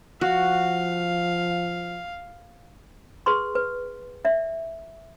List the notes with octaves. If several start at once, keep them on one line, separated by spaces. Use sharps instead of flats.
F3 F#4 F5
G#4 B4 C6 C#6
B4
D5 E5